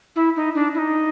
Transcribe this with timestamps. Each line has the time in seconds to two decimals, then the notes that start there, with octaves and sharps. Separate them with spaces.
0.16 E4
0.36 D#4
0.55 D4
0.74 E4
0.78 D#4